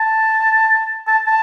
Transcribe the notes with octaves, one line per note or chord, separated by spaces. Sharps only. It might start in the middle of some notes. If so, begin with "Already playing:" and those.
Already playing: A5
A5
A5